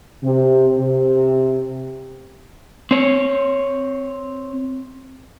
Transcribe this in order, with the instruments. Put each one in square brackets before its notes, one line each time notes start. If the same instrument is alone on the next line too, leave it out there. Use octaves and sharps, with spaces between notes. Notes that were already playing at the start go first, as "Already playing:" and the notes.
[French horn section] C3
C3
[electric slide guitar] C4 C#5